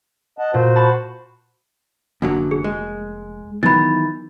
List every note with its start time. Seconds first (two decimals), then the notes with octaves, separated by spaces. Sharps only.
0.38 D#5 F#5 A5
0.54 A#2 F#4 C5
0.76 A5 B5 C#6
2.22 F1 F#2 D3 F#3 A#3
2.51 G#4
2.64 G#3
3.63 D#3 E3 F#3 B3 B5 A6